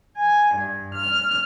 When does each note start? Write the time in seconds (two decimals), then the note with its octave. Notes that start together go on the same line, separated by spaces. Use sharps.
0.16 G#5
0.53 G2
0.94 F6